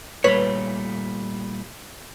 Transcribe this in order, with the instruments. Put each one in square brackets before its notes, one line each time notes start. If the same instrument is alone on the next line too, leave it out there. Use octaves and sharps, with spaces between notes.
[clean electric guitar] A#2 G3 A3 [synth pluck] B4 [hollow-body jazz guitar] C#5